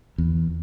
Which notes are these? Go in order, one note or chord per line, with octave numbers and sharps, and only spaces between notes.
E2